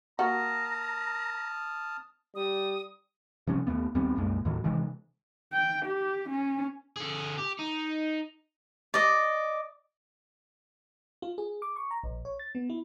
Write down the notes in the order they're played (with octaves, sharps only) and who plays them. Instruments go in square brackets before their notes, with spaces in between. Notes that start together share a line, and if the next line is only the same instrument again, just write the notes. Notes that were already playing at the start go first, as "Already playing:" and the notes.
[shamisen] A#3 F#4 [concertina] A5 D#6 F6 [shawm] A#5
[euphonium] G3 [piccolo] D#6
[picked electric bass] C3 F3 G3 C#4
D#2 G#2 A3 B3
D#2 G3 B3 C4
C2 F#2 A#2 G#3
D#2 A2 D#3 F#3
C3 D#3 E3 G#3
[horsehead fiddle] G5
G4
C#4
[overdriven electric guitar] D3 G#4
G4
D#4
[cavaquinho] D5 D#5
[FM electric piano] F4
G#4
D6
C#6
A#5
A#1
C#5
A6
B3
E4